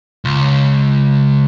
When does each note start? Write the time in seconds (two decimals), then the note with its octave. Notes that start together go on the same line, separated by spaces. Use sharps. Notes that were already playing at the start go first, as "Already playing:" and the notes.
0.25 C#2